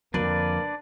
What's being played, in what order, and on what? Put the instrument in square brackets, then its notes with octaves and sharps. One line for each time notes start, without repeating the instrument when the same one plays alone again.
[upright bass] F2 D3 [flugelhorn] A#3 [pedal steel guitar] D4 B4 D5